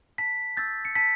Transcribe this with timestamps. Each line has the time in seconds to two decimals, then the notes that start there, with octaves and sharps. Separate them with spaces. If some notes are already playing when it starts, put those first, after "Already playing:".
0.18 A5 B6
0.57 E6 G6 A6
0.85 C#7
0.95 A5 B6